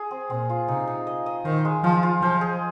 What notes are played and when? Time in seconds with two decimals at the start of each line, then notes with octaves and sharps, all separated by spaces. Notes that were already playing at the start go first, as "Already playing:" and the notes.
Already playing: G#4
0.11 C4
0.30 A#2 C4
0.49 F4
0.68 C3 D#4
0.87 D#4
1.07 D#5
1.26 D#5
1.45 D#3 C5
1.65 G#3
1.84 F3 F4
2.03 F4
2.22 F3 C5
2.41 G#4